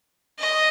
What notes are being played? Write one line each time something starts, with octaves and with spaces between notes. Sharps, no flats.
D#5